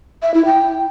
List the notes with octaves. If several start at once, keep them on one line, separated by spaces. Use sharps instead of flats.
E5
E4
G5